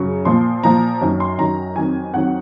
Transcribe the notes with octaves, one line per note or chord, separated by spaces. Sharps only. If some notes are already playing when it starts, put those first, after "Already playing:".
Already playing: F#2 C#3 F#3 C#6
A#2 F3 C6
A#2 F3 A#5
F#2 D#3 F#3
C6
F#2 D#3 F#3 A#5
F2 D#3 F#3 G#5
F2 D#3 F#3 F#5